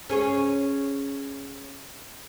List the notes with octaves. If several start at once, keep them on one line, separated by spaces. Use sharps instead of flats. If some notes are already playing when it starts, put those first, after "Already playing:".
C#4 G#4 C#5